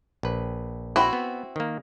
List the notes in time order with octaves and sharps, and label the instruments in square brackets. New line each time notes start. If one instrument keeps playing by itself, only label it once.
[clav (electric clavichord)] A#1 B4
[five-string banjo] C4 E4 F#4
[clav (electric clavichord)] B3
D#3 A#3